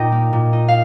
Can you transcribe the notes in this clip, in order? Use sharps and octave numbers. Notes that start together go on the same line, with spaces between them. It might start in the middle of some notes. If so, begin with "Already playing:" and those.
Already playing: A#2 D#4 D#5 G5 A#5
A#3
A#2
D#4
F5